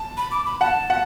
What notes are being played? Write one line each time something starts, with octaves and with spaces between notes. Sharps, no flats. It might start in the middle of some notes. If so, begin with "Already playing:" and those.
Already playing: A5
B5
D6
B5
F#5 A5
F#5